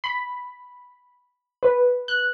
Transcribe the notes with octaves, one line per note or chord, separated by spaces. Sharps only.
B5
B4
F#6